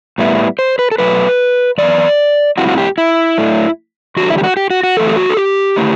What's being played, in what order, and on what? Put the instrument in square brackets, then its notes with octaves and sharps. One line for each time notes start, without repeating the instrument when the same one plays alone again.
[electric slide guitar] A2 G3 B3 E4
C5
B4
A4
B2 F#3 A3 B4
F#2 E3 B3 D5
A2 G3 C4 E4 F#4
F#4
G4
E4
A2 F#3 A3 D4
E2 D3 G3 F#4
E4
G4
F#4
G4
F#4
F#4
F#2 E3 A3 E4 A4
G4
F#4
A4
G4
D3 A3 E4